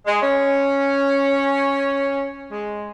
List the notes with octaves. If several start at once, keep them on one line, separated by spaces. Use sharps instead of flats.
G#3
C#4
G#3